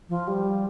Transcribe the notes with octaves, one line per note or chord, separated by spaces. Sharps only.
F3
G3